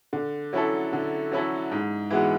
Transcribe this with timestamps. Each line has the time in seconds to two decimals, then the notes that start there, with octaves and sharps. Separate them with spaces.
0.13 D3
0.53 F#3 C#4 E4 A4
0.93 D3
1.31 F#3 C#4 E4 A4
1.71 G#2
2.10 E3 G#3 B3 F#4